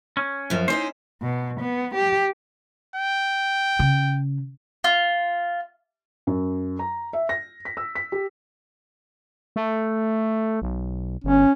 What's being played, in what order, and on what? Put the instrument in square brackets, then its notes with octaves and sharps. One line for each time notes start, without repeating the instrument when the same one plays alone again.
[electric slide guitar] C#4
[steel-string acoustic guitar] F#2 F3
[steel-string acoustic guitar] C#4 D#4 E4 [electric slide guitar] C5
[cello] B2
B3
G4
[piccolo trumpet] G5
[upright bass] C#3
[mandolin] F4
[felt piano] F#2
A#5
E5
A#6
B6
E6
B6
G4
[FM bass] A3
B1
[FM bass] G1 [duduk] C#4